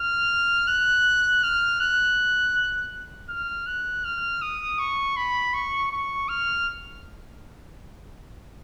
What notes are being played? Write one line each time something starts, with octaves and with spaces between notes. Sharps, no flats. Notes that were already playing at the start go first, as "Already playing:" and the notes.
Already playing: F6
F#6
F6
F#6
F6
F#6
F6
D#6
C#6
B5
C#6
C#6
F6